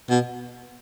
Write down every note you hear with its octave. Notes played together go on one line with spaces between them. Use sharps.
B2